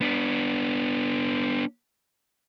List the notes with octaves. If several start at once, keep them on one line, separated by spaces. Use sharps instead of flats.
B3 D4